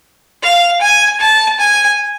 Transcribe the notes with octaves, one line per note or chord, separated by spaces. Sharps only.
F5
G#5
A5
G#5